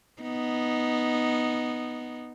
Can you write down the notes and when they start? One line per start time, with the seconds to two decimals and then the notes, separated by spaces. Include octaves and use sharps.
0.22 B3 D#4